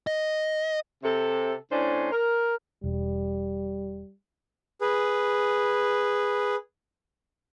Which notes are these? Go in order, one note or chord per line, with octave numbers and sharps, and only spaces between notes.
D#5
C3 A4
A2 C#4 D4 C5
A#4
E1 G3
G#4 B4